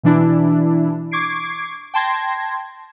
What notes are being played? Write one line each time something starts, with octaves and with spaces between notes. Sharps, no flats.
B2 E3 D4 E4
C#6 D6 G#6 C7 D7
G5 A5 C6 G#6 A#6